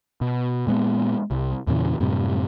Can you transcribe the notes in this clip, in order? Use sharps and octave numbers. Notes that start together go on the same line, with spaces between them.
B2
A#2 G#3 A#3 B3
C2
E2 A#2 C#3 E3
F#2 A2 C3 G3